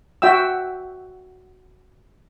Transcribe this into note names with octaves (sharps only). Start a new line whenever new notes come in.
F#4 E5 G5 E6